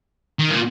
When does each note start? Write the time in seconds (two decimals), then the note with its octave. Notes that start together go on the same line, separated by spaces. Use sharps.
0.39 D#3
0.50 A#2